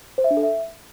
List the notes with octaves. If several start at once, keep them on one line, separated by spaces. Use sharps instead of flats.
C5
E5
D4
A4
E5